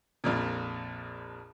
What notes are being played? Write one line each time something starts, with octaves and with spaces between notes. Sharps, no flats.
A#1 F2 A#2